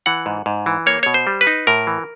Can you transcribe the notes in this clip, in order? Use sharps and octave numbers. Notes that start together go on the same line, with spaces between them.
E3 F#5
G#2
G#2
E3
A#3 C#5
B2 C#5
C5
G3
B4
D#4
A2 A#4
E3